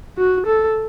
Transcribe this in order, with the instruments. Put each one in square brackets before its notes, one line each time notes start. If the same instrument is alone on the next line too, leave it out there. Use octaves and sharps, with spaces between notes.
[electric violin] F#4
A4